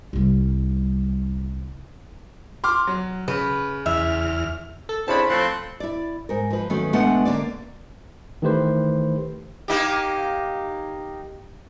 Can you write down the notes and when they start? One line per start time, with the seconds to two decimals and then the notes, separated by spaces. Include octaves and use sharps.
0.13 C2 G3
2.64 C6 D6 F6
2.87 F#3
3.28 C#3 B4
3.86 E2 E5 F6
4.89 A4
5.08 C#3 C4 D4 E4 C5 A5 B5
5.29 F3 A3 C4 C6 F#6
5.80 E4 D5
6.29 G#2 A#4
6.50 F3 B4
6.70 D#3 F#3 A3 C#4
6.93 B2 G#3 A3 B3 D4 F#5
7.25 D3 A#3 C#4 D5
8.42 D#3 E3 A3 G4 B4 C5
9.68 A#3 D#4 G4